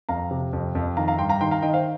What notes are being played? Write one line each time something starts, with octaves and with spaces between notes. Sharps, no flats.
F2 F5 A#5
C3
F2
F2
D#3 F5 A#5
F5 A#5
G2 G5 C6
F5 A#5
D#3 G5 C6
F5 A#5
D#3 D#5 G5
C5 F5